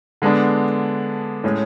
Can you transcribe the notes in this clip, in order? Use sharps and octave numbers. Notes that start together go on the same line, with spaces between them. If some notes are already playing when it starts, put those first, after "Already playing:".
D3 G#3 B3 D4
A2 G#3 C#4